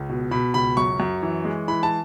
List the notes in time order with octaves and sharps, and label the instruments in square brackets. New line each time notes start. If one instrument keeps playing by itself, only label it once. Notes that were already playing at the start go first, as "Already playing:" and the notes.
Already playing: [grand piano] C#2
B2
B2 B5
C#2 B5
F#2 C#6
F#2
E3
G#3
E3 B5
A5